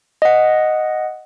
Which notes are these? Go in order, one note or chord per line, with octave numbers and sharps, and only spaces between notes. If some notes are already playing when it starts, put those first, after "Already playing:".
D#5 F#5